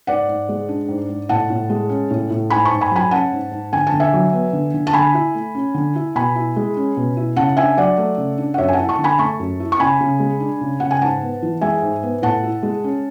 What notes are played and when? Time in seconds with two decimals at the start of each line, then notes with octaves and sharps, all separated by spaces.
0.07 G#2 D5 F#5
0.28 G#2
0.49 G#3
0.69 D4
0.89 G#2
1.09 G#2
1.29 A2 F#5 A5
1.50 A2
1.70 G#3
1.89 C#4
2.11 A2
2.31 A2
2.50 G#2 G#5 B5
2.65 A5 C#6
2.71 G#2
2.81 G#5 B5
2.91 F#3 G#5 B5
3.11 C#4 F#5 A5
3.32 G#2
3.51 G#2
3.73 D3 G#5
3.87 A5
3.92 D3
4.00 E5 G#5
4.13 F#3
4.33 B3
4.53 D3
4.74 D3
4.87 A5
4.93 D3 G#5 B5
5.14 E4
5.35 A3
5.55 C#4
5.74 D3
5.96 E4
6.15 B2 G#5 B5
6.36 E4
6.56 G#3
6.77 C#4
6.97 B2
7.17 E4
7.36 C#3 F#5 A5
7.57 D4 E5 G#5
7.77 F#3 D5 F#5
7.98 A3
8.17 C#3
8.38 D4
8.54 F#5
8.58 F#2 C#5 E5
8.69 G#5
8.73 F#5 A5
8.79 E4
8.89 A5 C#6
8.99 D3
9.04 G#5 B5
9.18 A3 A5 C#6
9.39 F#2
9.60 E4
9.72 C#6
9.80 C#3 G#5 B5
10.01 C#3
10.20 G#3
10.40 D4
10.61 C#3
10.80 C#3 F#5
10.91 G#5
11.01 G#2 F#5 A5
11.22 B3
11.42 E3
11.61 G#3 E5 G#5
11.82 G#2
12.03 B3
12.22 A2 F#5 A5
12.44 E4
12.63 G#3
12.84 C#4